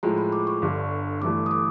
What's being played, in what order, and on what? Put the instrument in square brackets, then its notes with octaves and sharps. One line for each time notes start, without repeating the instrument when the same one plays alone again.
[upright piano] A2 F3 G#3 [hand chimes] A#5
[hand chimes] B5
D6
C#6
[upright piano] G1 G2 D3
[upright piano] G1 G2 E3 A3 [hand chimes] D6
[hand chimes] D#6
D6